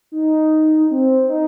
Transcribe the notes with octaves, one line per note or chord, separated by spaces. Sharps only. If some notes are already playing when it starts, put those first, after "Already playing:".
D#4
C4
D#4